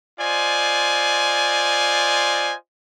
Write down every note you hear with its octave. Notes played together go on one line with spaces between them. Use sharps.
F4 C5 D5 D#5 G#5